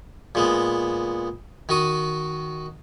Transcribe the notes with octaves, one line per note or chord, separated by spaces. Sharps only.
A#2 G#3 B3
D#3 F#4 D#6